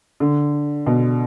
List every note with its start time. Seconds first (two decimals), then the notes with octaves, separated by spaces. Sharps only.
0.20 D3
0.87 B2